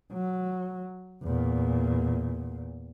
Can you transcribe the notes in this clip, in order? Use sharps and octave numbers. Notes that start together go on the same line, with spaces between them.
F#3
E2 A#2